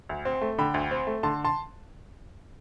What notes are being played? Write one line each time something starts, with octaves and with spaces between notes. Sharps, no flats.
D2
C4
A3
D3 G5 B5
D2
C4
A3
D3 A5 C6
A5 C6